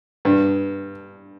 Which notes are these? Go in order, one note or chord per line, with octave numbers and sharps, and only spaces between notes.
G2